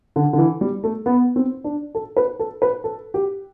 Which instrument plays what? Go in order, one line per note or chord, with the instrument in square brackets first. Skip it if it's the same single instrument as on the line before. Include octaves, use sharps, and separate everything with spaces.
[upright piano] D3
D3
E3
G3
A3
B3
C4
D4
A4
B4
A4
B4
A4
G4